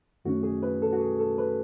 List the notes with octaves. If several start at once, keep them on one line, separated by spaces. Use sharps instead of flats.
F#2 D#3 A3 C#4 F#4
G#4
B4
A4
F#4
G#4
A4
B4